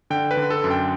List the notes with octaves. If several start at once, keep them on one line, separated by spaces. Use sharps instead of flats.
D3 G5
B4
D3
A4
F#2
G5